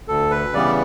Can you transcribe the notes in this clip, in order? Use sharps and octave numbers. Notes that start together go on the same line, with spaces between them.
D2 A4
B4
C#3 E3 G3 B3 D5